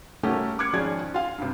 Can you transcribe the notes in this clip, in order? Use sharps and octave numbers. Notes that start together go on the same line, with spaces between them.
G3 A3 A#3 C#4 F#4 G4
D6 F6 F#6 G#6 C#7
G#1 F3 C#4 G#4 D5 G#6
F4 F5
G2 C3